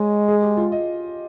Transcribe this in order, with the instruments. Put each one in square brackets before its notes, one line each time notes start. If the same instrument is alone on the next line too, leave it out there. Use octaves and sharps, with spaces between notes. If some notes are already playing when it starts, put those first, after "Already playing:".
Already playing: [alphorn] G#3 [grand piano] C#5 D#5
[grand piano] G#4
G4
F4
D#5